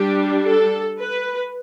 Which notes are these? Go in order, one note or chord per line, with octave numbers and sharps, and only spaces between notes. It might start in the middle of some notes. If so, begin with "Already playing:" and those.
Already playing: G3 D4 G4
A4
B4